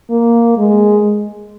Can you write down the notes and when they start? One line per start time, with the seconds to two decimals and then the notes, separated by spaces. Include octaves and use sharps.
0.10 A#3
0.57 G#3